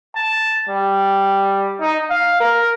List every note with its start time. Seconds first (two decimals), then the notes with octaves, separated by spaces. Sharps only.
0.15 A5
0.68 G3
1.81 D#4
2.10 F5
2.40 A#4